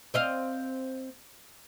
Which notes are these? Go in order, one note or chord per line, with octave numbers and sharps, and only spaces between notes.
C4 D#5 F5